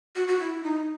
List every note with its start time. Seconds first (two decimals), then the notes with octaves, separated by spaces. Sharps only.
0.16 F#4
0.28 F#4
0.40 E4
0.63 D#4